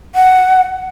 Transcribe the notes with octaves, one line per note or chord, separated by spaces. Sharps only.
F#5